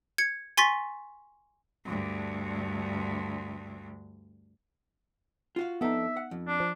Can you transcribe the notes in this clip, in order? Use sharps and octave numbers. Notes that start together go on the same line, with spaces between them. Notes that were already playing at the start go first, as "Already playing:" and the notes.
G#6 C#7
G#5 C6 C#6 A6 B6
D2 G2
F4 F#4 F5
F2 B3 D4 D#4 A4 E5
F#5
F2
D4
F3